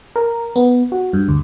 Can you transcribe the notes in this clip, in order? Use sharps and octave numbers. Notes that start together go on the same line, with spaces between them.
A#4
B3
F#4
G2
D2